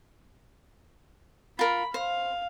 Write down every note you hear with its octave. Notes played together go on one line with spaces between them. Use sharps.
F4 A#4 B5
C5 F5